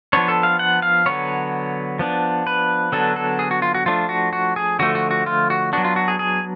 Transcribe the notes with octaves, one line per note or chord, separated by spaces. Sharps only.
F3 B3 D4 C#5
A4
F5
F#5
F5
D3 F#3 B3 C#5
F3 B3 D4
B4
D3 F#3 B3 D4 A4
A4
G#4
F#4
F4
F#4
F3 A3 D4 F4
F#4
F#4
G#4
D3 F3 A3 F#4
F#4
F#4
F4
F#4
F#3 B3 D4 F#4
F4
F#4
G#4
G#4